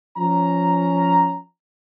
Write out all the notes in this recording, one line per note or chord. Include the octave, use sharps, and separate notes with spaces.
F3 C#4 A#5